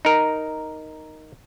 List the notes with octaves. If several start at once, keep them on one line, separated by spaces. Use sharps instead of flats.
D#4 A#4